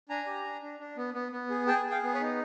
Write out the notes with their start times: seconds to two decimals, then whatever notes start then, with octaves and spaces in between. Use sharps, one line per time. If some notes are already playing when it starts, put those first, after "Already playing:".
0.09 D4 G#5 A#5
0.26 G4
0.45 D4
0.62 D4
0.80 D4
0.97 B3
1.14 B3
1.32 B3
1.50 G#4
1.67 G#4 G5 A5
1.86 G#4
1.91 F5 G5
2.03 B3
2.14 B4 C#5
2.21 D#4